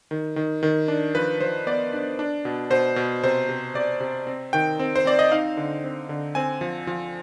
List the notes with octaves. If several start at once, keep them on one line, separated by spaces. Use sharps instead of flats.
D#3
D#3
D#3
D4
F3 B4
F3 C5
B3 D5
D4
D4
B2
B2 C5
B2
C3 C5
C3
C3 D5
C3
C4
D#3 G5
C4
C5
C4 D5
D#5
D#4 F5
D3
C4
D3
C4 G#5
F3
F3